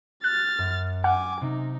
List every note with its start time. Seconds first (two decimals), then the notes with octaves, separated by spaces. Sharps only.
0.24 F6 F#6 A6
0.58 F#2
1.04 F#5 G#5 D6 F6
1.41 C3 D#4